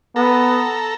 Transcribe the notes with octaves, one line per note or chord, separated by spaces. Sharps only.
B3 A4 A#5